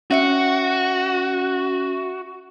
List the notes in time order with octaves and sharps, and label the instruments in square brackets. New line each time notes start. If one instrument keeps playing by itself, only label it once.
[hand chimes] C#4 E5 C#7 [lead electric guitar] F#4